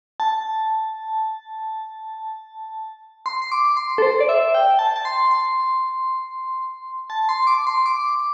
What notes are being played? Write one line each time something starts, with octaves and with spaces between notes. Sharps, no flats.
A5
C6
C6
D6
C6
A4
C5
D5
E5
G5
A5
A5
C6
C6
A5
C6
D6
C6
D6